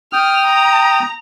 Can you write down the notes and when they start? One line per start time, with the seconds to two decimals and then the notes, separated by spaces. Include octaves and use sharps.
0.13 G5 D#6 F6
0.46 A#5